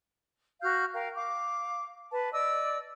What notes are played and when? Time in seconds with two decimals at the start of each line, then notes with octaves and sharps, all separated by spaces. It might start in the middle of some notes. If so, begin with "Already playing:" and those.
0.61 F#4 F5 F6 G6
0.94 A#4 F5 G5
1.16 F5 D6
2.11 B4 A5
2.32 D5 D#5 D6 E6